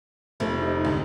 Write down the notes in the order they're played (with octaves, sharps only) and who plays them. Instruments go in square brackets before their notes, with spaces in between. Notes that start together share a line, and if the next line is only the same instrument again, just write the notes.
[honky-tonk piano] F1 F3 [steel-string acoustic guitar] C3 G3 A3
[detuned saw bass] D#4
[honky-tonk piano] D2 G#2